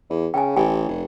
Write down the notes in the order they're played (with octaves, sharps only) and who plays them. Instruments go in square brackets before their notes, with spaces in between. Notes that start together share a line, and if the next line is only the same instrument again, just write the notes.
[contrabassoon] E2
[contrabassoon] C#3 [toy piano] G5 G#5
[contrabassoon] A1 [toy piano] G4 G5 G#5
[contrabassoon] F1